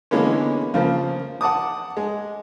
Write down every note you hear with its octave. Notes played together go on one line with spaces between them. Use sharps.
D3 E3 G#3 A#3 B3 C#4
C#3 F3 A#3
F#5 A5 D6 D#6
G#3